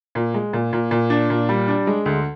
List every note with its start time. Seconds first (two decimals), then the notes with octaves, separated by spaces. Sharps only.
0.15 A#2
0.34 G#3
0.53 A#2
0.73 A#2
0.91 A#2
1.10 D4
1.30 A#2
1.49 G3
1.68 D4
1.87 G#3
2.06 D2